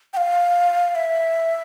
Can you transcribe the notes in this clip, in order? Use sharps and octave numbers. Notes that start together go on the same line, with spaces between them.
G5
F5
E5